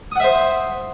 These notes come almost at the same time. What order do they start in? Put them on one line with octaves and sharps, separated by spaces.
D#6 F#5 E5 C5